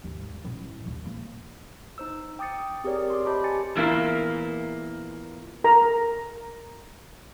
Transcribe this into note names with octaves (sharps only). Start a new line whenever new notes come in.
D#2 G#2
D#1 E4
A#1 D#2
A#3
D#4 C5 E6
G5 D6 D#6 A6 C#7
C4 G4 G#4 A#4 C#5 D5
C6 D6
G4 C5 D#5 A5 B5 D6
G4 G#5 A6 C#7
E2 A#2 A#3 E4
A#4 A#5